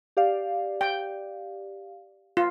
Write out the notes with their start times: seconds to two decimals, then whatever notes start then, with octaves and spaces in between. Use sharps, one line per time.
0.17 G4 D5 F5
0.81 G5
2.37 F4